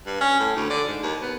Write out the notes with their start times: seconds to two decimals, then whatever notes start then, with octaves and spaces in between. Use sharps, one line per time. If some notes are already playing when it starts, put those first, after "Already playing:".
0.06 G2
0.21 C#4
0.40 A2
0.56 D2
0.70 D3
0.88 G#2
1.03 D#2
1.22 B3